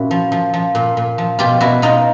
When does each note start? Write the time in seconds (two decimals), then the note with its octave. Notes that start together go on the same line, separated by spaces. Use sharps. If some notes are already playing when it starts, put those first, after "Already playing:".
Already playing: A#2 C#4 E4 F#4
0.11 F3
0.32 F3
0.54 F3
0.75 A#2
0.97 A#2
1.18 F3
1.39 B2 F4 G4
1.60 B2 E4 F#4
1.82 B2 D#4 F4